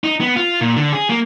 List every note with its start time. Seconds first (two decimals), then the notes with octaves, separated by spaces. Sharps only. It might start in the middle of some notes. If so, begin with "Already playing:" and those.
0.04 D#4
0.20 B3
0.36 F4
0.61 A#2
0.77 D3
0.93 G#4
1.10 A#3